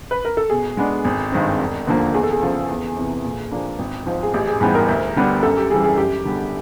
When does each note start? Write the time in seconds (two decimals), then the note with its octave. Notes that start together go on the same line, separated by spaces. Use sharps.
0.11 B4
0.25 A#4
0.37 A4
0.50 B2 G#4
0.77 G#3 B3 D4
1.05 G#1
1.32 G2 D#3 G#3 C4
1.59 E1
1.87 D#2 D3 F3 A#3
2.14 E2 G#4
2.23 A4
2.32 G#4
2.42 C#3 F3
2.69 E2
2.97 C3 E3
3.24 A#2
3.52 F3 A#3 D4
3.79 G#1
4.06 G#2 F3
4.23 G#4
4.34 A1 G4
4.48 G#4
4.61 G#2 E3 G3 B3 G#4
4.75 A#4
4.88 D2
5.16 D3 G3 B3 D4
5.43 F#2 A4
5.57 G4
5.70 C#3 E3 G3 G#4
5.84 G#4
5.97 F#2 G4
6.25 D3 G3 B3